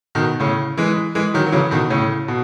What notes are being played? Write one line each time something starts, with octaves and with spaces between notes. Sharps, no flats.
B2 D#3
A2 C#3
E3 G#3
E3 G#3
D#3 F#3
F#3
C#3 E3
B2 D#3
A2 C#3
B2